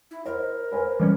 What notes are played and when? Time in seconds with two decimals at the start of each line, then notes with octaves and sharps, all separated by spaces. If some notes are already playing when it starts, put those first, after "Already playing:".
0.11 E4
0.25 A#4 C5 D#5 B5
0.72 B4 C5 G#5
1.00 E3 G3 C#4